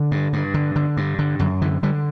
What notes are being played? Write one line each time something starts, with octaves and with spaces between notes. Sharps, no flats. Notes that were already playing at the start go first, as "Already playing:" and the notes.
Already playing: D3
G2
G2
D3
D3
G2
D3
F#2 D3
D3 E3
D3 G3